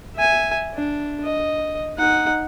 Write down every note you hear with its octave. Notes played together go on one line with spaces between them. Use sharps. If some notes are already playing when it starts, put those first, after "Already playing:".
E5 G#5
D4
D#5
D#4 F#5